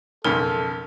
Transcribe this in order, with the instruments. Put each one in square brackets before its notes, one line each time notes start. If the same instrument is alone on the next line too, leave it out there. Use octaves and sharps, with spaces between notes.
[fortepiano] B1 F2 C#3 [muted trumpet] A4 [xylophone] A#4